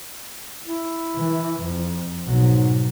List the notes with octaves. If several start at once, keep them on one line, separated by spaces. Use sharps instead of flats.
E4
E3
F2
B1 G#2 F#3